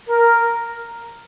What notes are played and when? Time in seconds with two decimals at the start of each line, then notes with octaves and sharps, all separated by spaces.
0.09 A#4